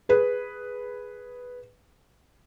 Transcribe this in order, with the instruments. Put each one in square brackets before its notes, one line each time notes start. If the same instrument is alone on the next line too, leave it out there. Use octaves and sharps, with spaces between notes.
[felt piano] G#4 B4